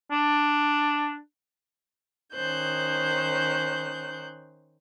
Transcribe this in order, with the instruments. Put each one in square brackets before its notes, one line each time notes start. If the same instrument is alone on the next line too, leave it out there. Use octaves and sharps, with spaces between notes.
[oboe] D4
[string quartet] D#3 C#4 C5 F#6 G6